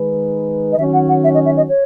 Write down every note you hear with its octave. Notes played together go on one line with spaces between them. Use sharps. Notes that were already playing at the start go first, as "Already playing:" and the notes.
Already playing: D#3 G#3 D#4 G#4 B4
D#5
D#3 F#3 C#4 F#4 E5
F#5
F#5
E5
D#5
E5
D#5
C#5